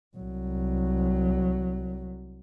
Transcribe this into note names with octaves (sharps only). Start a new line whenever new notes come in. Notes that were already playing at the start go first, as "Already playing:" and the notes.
C2 F#3